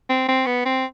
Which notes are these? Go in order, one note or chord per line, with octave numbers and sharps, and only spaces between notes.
C4
C4
B3
C4